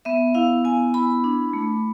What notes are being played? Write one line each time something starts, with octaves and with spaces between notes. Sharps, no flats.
B3 E5
E4 F5
B3 G#5
E4 B5
D4
A3